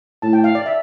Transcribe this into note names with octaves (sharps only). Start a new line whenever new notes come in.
A2 A5
G5
F5
D5
E5